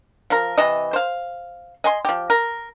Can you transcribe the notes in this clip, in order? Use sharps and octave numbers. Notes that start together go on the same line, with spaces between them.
F3 A#4
C3 E3 D#5
C5 F5
D#5 G#5 C6
F3 G4
A#4